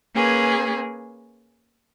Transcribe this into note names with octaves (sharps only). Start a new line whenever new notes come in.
A#3 C#4 G#4 B4